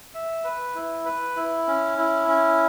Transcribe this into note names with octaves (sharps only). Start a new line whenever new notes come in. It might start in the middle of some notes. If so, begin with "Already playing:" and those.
E5
B4
E4
B4
E4
C#4
E4
C#4